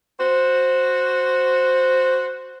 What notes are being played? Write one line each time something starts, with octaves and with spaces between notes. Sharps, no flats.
F#4 C5